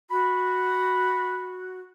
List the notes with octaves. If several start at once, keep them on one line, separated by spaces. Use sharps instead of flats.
F#4 B5